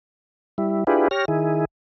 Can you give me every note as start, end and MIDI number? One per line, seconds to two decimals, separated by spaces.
0.58 0.84 55
0.58 0.84 64
0.87 1.08 62
0.87 1.08 64
0.87 1.08 65
0.87 1.08 67
0.87 1.08 68
0.87 1.08 71
1.11 1.25 67
1.11 1.25 73
1.11 1.25 89
1.11 1.25 94
1.28 1.65 51
1.28 1.65 64
1.28 1.65 68